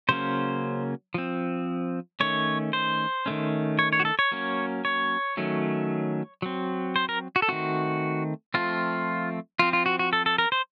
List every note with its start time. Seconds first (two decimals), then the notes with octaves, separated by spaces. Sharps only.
0.09 C#3 F#3 A#3 C#4 C5
1.14 F3 C4
2.20 D#3 A3 C#4 C#5
2.73 C5
3.26 D#3 A3 C#4
3.79 C#5
3.93 C#5
4.00 F#4
4.05 A4
4.19 C#5
4.32 F#3 A#3 C#4
4.85 C#5
5.37 D#3 F#3 A3 C#4
6.42 F#3 C4
6.96 C5
7.09 A#4
7.36 F#4
7.42 A4
7.48 D#3 A3 C4 F#4
8.54 F3 A3 C4 F4
9.59 F3 C4 F4
9.73 F4
9.86 F#4
9.99 F#4
10.13 A4
10.26 A4
10.38 A#4
10.52 C5